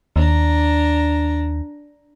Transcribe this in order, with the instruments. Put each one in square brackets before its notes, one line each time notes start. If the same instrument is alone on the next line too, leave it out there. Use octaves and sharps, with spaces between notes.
[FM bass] D#2 [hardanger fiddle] D4 A#5